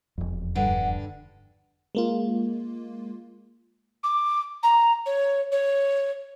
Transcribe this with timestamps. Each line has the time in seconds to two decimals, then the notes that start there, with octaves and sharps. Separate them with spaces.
0.18 E1 F2
0.55 G2 D3 F#5
1.95 G#3 A#3 F4
4.03 D6
4.63 A#5
5.06 C#5
5.51 C#5